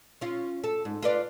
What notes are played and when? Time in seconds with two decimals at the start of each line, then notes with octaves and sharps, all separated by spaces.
0.21 C#4 F4
0.64 A4
0.85 G#2
1.02 F4 B4 D5